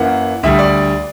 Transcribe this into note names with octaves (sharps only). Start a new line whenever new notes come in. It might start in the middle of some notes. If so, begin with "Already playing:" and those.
Already playing: F#2 E3 A#3 F#5
D2 D3 G3 E5
D5